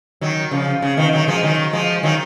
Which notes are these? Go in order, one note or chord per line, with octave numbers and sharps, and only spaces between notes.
D#3 F#3
C#3 F3
C#3
B2 D#3
D#3 F#3
F3 G#3
D#3 F#3
F3 G#3
D#3 F#3